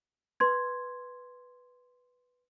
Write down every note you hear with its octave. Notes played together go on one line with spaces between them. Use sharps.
B4 C6 G#6